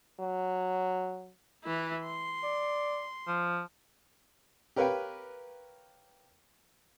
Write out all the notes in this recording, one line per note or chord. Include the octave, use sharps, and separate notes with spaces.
F#3
E3 E4
C6
D5
F3
G4 A#4 B4 C#5 F5 G5